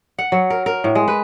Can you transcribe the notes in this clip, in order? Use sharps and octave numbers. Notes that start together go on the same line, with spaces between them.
F#5
F#3
A#4
A#4
A2
G#3
B4